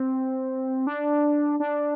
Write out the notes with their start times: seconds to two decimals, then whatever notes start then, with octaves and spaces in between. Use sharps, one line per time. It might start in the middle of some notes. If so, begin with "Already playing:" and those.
Already playing: C4
0.87 D4
1.60 D4